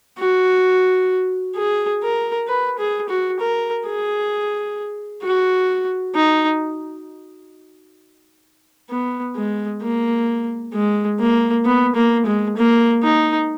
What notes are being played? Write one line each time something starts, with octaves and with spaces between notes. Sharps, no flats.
F#4
G#4
A#4
B4
G#4
F#4
A#4
G#4
F#4
D#4
B3
G#3
A#3
G#3
A#3
B3
A#3
G#3
A#3
D#4